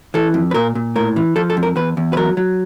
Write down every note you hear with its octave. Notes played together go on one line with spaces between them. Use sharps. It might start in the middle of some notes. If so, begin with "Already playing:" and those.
E3 A4
F2
B4
A#2 A#4
A#2
A2 A#4
E3
F3 A4
A4
F2
A#4
E2 B4
E2
B4
F#3 A#4
F#3